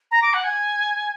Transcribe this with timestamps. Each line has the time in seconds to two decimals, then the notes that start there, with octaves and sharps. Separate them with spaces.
0.11 A#5
0.22 D6
0.33 F#5
0.43 G#5